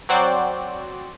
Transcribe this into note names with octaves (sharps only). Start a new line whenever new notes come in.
F#3 C4 F#4 C5 D5